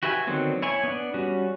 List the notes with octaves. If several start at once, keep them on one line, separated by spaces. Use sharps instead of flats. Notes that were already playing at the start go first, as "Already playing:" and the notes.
F#4 G4 B4 E5 G#5
D3 D#3 F#3 B3 C4
E4 C#5 G#5
B3 D4
G3 C#4 F#4